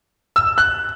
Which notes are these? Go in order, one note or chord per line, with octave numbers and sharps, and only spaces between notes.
E6
F#6